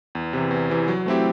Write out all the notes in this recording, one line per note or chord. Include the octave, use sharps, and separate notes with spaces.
E2
C3 E3
E2
C3 E3
F#3
A3 C4 E4 G4